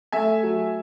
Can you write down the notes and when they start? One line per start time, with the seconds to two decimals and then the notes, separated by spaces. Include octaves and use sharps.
0.12 A3 E5 G#5
0.43 F#3